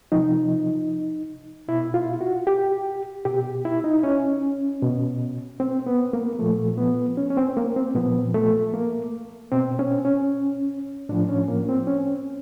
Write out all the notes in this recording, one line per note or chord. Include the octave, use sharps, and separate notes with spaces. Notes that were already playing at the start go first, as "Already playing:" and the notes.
C3 F3 D#4
B2 E4
F4
F#4
G4
B2 G4
E4
D#4
C#4
B2
C4
B3
A#3
A#2 F3 A3
B3
C#4
C#4
C4
A#3
C4
A#2 F3 B3
A3
A#3
B2 C4
C#4
C#4
A2 F3 D4
C#4
A#3
C4
C#4